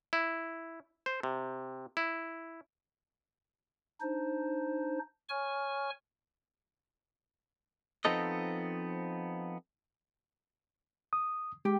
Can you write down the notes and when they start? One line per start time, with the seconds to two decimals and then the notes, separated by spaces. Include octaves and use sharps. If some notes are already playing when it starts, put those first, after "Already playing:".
0.13 E4
1.06 C5
1.23 C3
1.97 E4
4.00 D4 D#4 C5
5.29 C#5 G#5 C#6 F6
8.05 F3 B3 C4 D#4 A4 D#5
11.13 D#6
11.65 G#3 G4